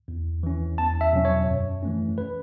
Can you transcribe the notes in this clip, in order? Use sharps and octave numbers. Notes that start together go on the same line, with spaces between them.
E2
E3 C#4
E2 A5
E5
B2 F#3 C#4
C#5
F#2
E3 A3 C#4
B4